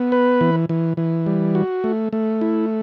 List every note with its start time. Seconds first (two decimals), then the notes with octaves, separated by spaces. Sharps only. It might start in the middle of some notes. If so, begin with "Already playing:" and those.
Already playing: B3
0.12 B4
0.41 E3
0.69 E3
0.97 E3
1.26 G3
1.55 F#4
1.84 A3
2.13 A3
2.41 E4